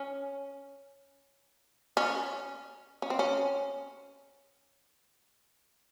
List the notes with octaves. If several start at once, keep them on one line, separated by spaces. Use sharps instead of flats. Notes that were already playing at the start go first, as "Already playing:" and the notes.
Already playing: C#4
C#4
C#4
C4
C#4